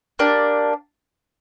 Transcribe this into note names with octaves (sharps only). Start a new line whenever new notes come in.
A#3 D4 G4